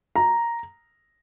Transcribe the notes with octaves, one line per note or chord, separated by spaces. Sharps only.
A#5